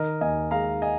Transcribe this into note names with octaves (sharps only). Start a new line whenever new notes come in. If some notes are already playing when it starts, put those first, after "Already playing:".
Already playing: D#3 A#4 D#5
D#2 D#5 G#5
G#3 F5 A#5
D#5 G#5